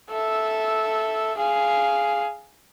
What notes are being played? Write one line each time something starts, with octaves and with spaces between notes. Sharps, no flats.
A4 E5
G#4 F5